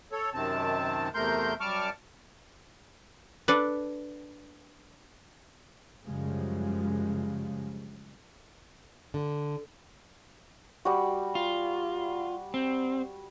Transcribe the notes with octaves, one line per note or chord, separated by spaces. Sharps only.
A4 C#5
F#2 C3 D#3 C4 A5
E2 C3 A3 A#4 C6 G6
F#2 G3 A5 C#6 D6 F6
D4 A4 B4
F#2 C#3 F3 G3 G#3
D3
G3 F#4
F4
C4